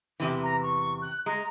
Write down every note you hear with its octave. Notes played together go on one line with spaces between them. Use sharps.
E2 C3 E3
A#5
C#6
F#6
G#3 A#5